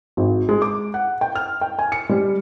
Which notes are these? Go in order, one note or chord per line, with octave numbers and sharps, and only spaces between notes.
G#1
G#3
D6
F#5
G5
F6
G5
G#5
C#7
G3